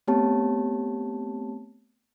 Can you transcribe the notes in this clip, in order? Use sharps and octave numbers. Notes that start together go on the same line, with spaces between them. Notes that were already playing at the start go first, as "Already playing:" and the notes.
A3 B3 C4 G4 C#5 A5